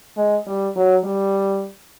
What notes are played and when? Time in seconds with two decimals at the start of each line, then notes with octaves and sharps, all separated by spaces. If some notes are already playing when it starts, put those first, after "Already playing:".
0.17 G#3
0.47 G3
0.76 F#3
1.04 G3